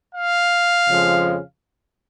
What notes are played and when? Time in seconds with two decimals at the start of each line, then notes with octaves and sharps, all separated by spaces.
0.15 F5
0.87 F2 C#3 F3 G#3